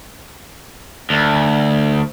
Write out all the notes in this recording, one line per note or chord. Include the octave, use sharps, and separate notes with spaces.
D2